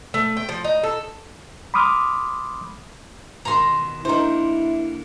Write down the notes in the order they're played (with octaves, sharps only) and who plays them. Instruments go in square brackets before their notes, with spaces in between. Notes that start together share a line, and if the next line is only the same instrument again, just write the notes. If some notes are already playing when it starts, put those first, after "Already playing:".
[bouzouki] A3
G5
F3
D#4
A4
[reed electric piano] B5 C6 D6 D#6 F6
[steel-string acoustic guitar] B2 D#3 [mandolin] A#5 C6
[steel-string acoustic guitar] D3 A#3 [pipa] D#4 C5 [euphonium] E4